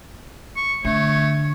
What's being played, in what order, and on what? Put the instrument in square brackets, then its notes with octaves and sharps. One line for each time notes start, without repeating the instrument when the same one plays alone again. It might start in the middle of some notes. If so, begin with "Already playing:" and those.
[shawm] C#6
[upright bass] D3 [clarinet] A3 [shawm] C#5